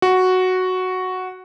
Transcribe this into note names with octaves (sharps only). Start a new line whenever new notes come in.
F#4